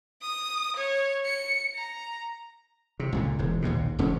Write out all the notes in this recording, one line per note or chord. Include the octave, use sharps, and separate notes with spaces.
D#6
C#5
C#7
A#5
C3
C#2 A#2 D3
E1 G#2
A#1 D#2 G#2 B2
E1 G#2 D3 C#4